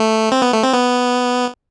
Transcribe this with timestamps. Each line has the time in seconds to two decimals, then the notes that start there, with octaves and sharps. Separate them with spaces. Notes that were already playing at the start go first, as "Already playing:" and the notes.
Already playing: A3
0.32 C4
0.42 B3
0.52 A3
0.63 C4
0.73 B3